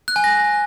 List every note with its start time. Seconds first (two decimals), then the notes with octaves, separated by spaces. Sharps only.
0.08 F#6
0.16 G#5
0.24 A#6